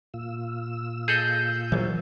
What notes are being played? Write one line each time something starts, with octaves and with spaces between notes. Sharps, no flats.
A#2 F4 E6
G#4 A4 D#5 G6
A#1 E3 F#3